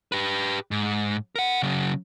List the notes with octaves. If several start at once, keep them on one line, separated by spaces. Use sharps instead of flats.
G4 B4
G#2
A#4 F#5
C#3 F#3